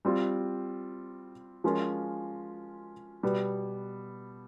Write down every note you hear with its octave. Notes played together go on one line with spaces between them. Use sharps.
G3 C4 F4
F3 G#3 C#4 F4 A#4
B2 G3 B3